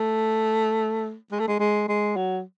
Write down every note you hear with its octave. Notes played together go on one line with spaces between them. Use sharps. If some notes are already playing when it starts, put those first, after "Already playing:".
Already playing: A3
G#3
A3
G#3
G#3
G#3
F#3